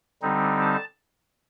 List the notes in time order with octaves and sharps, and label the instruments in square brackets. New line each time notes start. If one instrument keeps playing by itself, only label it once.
[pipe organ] D3 G3 C4 D#4
A5